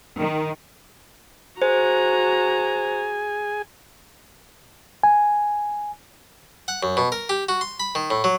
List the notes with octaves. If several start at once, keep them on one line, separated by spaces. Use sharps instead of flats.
D#3
F#4 G#4 C5 G#5 A#5
G#5
F#5
F#2
B2
A#4
G4
F#4
C6
B5
D#3
A2
F#3